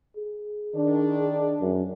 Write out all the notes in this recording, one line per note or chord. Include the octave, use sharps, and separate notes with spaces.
G#4
D#3 D4
F#2